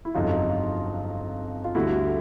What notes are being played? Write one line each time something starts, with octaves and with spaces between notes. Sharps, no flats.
E4
G1 F2 C#3 F#3 D#4 F4
F4
D2 D3 G3 E4 F#4